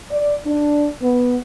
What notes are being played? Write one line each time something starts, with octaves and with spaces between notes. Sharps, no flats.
D5
D4
B3